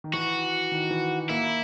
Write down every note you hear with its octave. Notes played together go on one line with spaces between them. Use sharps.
D#3
E3 F#4
D#3
E3
A#3 E4